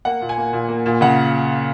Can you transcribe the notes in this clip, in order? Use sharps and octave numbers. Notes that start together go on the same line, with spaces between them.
A#3 F#5
A#2
G#5
A#3
A#2
A#3
A#2
C#3 F#5